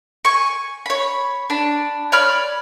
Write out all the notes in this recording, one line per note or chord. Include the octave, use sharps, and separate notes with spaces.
G#5 C#6
C#5 B5
D4 B5
C#5 D5 B5 F6